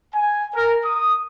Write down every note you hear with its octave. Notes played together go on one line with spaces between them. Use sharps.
G#5
A#4
D#6